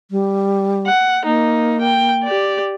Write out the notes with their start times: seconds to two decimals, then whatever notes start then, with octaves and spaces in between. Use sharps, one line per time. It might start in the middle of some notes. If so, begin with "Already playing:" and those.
0.11 G3
0.87 F#5
1.26 A#3 D#4
1.82 G5
2.24 G4 D5